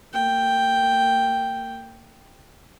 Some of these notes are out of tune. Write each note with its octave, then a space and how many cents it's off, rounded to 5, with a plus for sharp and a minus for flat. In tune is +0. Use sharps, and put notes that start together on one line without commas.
A#3 -35 G5 +0